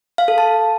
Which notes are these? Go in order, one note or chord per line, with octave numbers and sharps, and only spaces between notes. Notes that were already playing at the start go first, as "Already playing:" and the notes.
F5
A4
A5